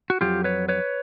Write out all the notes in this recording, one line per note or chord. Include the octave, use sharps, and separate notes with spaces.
F#4
F2 C#3 F#3 F4 G4
B4 C#5
B4 C#5